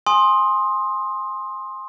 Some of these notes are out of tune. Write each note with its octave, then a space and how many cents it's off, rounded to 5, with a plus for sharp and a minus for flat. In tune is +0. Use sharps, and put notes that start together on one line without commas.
G#5 +0 C6 +15 D#6 +0